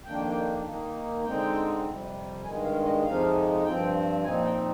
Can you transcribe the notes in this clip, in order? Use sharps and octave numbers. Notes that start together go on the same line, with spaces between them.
F2 D#3 A#3 D4 G5
D#3 A#3 D#4
D3 G#3 C4 D#4 G5
F2 C3 G3
G2 D#3 G#3 G#5
F5
D#5
F2 C3 F3 G#3 D#4 F5
G2 F3 C4 G5
A#2 F3 C4 D#4 G#5
G5